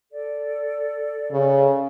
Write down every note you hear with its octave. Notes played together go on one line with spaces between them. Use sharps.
A4 D5
C#3